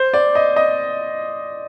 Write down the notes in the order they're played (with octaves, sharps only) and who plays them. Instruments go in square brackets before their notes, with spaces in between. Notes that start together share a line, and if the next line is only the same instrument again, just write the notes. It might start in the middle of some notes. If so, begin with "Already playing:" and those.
Already playing: [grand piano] C5
D5
D#5
D#5